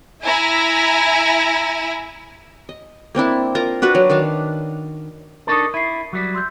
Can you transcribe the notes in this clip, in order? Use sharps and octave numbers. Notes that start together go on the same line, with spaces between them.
E4 E5 G#5 A#5
D#5
A#3 C4 D4 E4
F4 A#4 A#5
D4 F#4 B4
F#3
D#3 D4 F5 A5
D4 D#4 A4 A#4 C#6 D#6
E4 C7 D#7
F#3 G3
C6 E6 G6